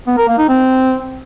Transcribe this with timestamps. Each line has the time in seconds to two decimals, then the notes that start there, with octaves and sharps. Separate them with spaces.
0.07 B3
0.17 A#4
0.28 A#3
0.38 D#4
0.48 C4